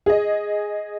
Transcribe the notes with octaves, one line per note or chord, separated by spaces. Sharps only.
G#4 D#5